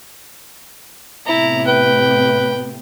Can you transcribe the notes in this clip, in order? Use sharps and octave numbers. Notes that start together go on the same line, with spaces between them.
A2 C3 B3 E4 A#5
B4 G5